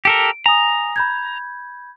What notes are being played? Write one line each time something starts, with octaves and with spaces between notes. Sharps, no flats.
G4 A4 A#4 D7
G#5 A#5 D#6
B5 G6 G#6